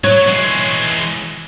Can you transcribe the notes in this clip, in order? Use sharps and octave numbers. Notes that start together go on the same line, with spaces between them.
F#3 C#5
E3 G#3